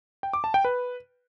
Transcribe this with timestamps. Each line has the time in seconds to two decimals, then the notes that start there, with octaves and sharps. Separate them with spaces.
0.23 G5
0.33 D6
0.44 A5
0.54 G5
0.65 B4